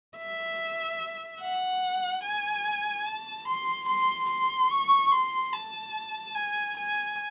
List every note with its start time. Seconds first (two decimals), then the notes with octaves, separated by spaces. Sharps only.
0.18 E5
1.42 F#5
2.24 G#5
3.07 A5
3.48 C6
3.89 C6
4.30 C6
4.71 C#6
5.12 C6
5.53 A5
6.35 G#5
6.77 G#5